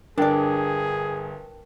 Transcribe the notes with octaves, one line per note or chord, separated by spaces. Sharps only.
G1 D4 G#4 A#4 D5 G5 A5